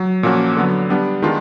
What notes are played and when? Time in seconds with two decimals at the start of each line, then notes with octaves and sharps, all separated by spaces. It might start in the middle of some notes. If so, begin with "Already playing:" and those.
Already playing: F#3
0.23 A#2 F3 A#3 C#4 F#4
0.56 D3 F#3 B3
0.90 G3 B3 D4
1.22 D#3 G#3 B3 D4 F4